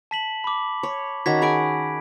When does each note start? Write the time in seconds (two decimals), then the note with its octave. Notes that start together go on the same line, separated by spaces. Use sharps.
0.11 A5 B6 F#7
0.44 B5 D6
0.83 C#5
1.26 D#3 C#4 F#4 G#6 B6
1.42 G#4 F#5 G#5 B5 D7